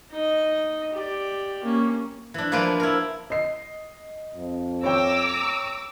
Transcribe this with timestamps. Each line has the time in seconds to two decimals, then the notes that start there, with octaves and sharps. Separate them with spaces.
0.11 D#4 D#5
0.93 G4 D5
1.64 A#3 C#4
2.34 E3 D4
2.52 F3 A#3 B4 C5 D5
2.80 E4 A#4
3.30 D#5 C7
4.34 F2
4.83 C#5 G5 A#5 D6 E6